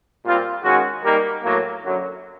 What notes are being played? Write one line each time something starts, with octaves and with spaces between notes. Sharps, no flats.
A#2 G3 C4 F4
D#3 G#3 C#4 F#4
G3 A#3 D#4 G4 A#4
A2 F#3 A#3
F#2 D3 F#3